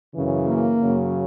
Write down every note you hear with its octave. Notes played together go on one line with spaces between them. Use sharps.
F#2 C#3 E3
A#3
F#2 C#3 F#3